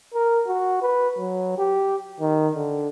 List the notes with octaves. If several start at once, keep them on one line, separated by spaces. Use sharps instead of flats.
A#4
F#4
B4
F#3
G4
D#3
D3